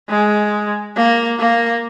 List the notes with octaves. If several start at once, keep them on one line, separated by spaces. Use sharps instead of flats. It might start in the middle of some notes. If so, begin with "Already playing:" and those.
G#3
A#3
A#3